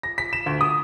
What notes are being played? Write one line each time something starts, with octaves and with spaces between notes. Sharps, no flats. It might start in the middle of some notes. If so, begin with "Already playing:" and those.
A#6
B6
E7
D2
D#6